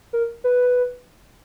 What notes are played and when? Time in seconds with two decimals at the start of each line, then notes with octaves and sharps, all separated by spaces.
0.13 A#4
0.44 B4